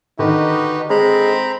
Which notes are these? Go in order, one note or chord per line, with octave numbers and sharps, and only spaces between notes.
D3 D#3 D#4 F#4 G4 B4
G#3 C4 A#5 B5